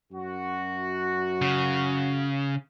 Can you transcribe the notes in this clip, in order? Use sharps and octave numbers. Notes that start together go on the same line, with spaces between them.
F#2 F#4
C#3